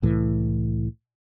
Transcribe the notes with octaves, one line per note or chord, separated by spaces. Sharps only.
C2 A2 E3